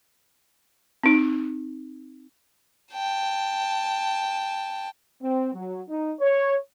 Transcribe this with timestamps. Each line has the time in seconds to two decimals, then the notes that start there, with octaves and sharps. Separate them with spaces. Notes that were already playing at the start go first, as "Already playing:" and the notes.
1.03 C4 D#4
2.92 G5 A5
5.22 C4
5.54 F#3
5.89 D#4
6.21 C#5